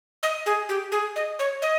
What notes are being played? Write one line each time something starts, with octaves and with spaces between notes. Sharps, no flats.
D#5
G#4
G4
G#4
D#5
C#5
D#5